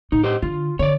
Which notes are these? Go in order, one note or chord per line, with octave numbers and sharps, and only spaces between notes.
A2 D#4
G4 C5 D#5
D3 F4
D3 C#5 D5